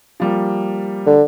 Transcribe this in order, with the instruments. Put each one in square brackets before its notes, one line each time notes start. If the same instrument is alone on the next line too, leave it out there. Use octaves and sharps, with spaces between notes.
[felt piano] F3 G3 A#3
[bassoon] D3